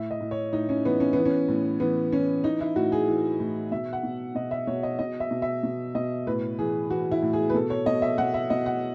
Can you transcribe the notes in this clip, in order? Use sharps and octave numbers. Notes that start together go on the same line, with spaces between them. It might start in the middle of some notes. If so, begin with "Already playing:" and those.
Already playing: A2 E5
D#5
A2
C#5
A2 D#4
C#4
E3 B3
C#4
E3 B3
C#4
A2
E3 B3
E3 C#4
E3 D#4
E4
A2 F#4
G#4
E3
A2
B2 E5
F#5
B2
B2 D#5
E5
B2 C#5
D#5
B2 D#5
E5
B2
E5
B2
B2 D#5
A2 B4
E3 G#4
E3 F#4
E4
A2
G#4
B4
B2 A4
C#5
B2 D#5
E5
B2 F#5
E5
B2 D#5
F#5